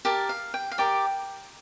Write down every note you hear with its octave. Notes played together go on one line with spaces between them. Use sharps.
G4 A#4 D5 A5
F5
G5
F5
G4 A#4 D5 G5